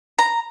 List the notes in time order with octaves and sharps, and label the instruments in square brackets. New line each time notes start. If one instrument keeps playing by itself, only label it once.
[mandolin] A#5